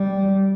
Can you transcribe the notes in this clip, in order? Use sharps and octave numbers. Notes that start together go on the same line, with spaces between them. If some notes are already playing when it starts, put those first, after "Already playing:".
Already playing: G3